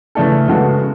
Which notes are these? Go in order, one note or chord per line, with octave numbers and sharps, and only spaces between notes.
C#3 E3 A3 D4 A4
C#3 G#3 B3 F#4 A4